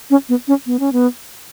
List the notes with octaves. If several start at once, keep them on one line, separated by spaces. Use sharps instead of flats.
C#4
B3
C#4
B3
C#4
B3